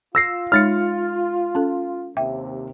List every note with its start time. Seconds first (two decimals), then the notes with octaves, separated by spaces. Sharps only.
0.15 F4 E6 A#6 C7
0.52 G#3 D#4 C#5 F6 A6 C#7
1.55 C#4 A4
2.17 D#2 C3 E5 G5